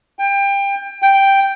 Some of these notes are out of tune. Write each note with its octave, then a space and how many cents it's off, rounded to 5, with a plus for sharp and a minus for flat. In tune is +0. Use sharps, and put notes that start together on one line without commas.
G5 +25
G5 +0